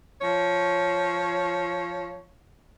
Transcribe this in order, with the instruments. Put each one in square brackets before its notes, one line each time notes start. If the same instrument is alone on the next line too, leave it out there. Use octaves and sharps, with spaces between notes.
[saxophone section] F3 C#5